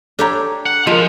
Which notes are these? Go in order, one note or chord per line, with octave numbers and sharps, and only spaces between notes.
D4 G4 A4 C#5 A#5
F#5
F3 G#3 F4 A#4